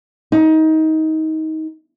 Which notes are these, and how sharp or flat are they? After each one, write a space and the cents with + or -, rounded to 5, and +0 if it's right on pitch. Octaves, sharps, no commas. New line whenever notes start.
D#4 +25